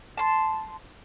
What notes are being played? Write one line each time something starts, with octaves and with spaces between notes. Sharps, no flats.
A5 C6